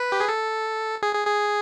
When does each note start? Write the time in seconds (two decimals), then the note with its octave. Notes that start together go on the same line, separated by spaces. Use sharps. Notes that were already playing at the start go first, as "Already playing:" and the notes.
Already playing: B4
0.12 G4
0.20 G#4
0.29 A4
1.03 G#4
1.14 G#4
1.27 G#4